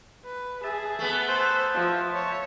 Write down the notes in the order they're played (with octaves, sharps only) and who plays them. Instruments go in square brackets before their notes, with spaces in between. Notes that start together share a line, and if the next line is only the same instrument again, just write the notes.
[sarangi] B4
[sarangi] G#4 [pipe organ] E5 A5
[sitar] A3 B3
[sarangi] C5
F3
C#5